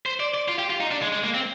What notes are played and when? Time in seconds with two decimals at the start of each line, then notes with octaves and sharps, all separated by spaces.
0.06 C5
0.20 D5
0.34 D5
0.48 F4
0.59 G4
0.70 F4
0.81 D#4
0.91 D4
1.02 G#3
1.12 G#3
1.24 A#3
1.34 C4